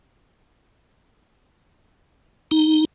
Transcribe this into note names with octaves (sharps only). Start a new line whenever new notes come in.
D#4